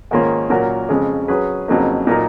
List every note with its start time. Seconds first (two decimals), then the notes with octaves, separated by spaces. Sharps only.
0.11 G#2 D#3 A#3 C#4 F4
0.50 A#2 F#3 C#4 F#4 A#4
0.89 F2 C#3 G#3
1.28 F#3 C#4 G#4 B4
1.68 F2 C#3 F#3 A#3 D#4
2.07 A#2 F#3 A#3 D#4 A#4